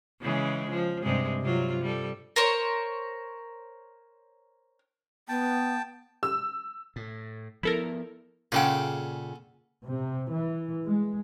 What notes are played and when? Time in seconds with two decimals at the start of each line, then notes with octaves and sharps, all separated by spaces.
0.21 C#3 E3 G#3
0.69 F3
1.02 G2 C3 G#3
1.42 C3 F#3 F4
1.82 G3 A4
2.36 A#4 C5 C#5
5.29 B3 G5 A5
6.23 E6
6.96 A2
7.63 F3 B3 E4 A4 A#4
8.52 A#2 C#3 G#4 A4 F#5 G5
9.87 C3
10.33 E3
10.87 G#3